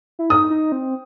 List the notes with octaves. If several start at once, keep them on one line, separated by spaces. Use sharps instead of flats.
E4
D#4 D#6
D#4
C4